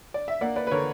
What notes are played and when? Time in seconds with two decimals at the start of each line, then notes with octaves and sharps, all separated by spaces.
0.14 D5
0.28 E5
0.41 A#3 D5 F#5
0.56 B4 D5
0.67 B4
0.71 D3 A#4 C#5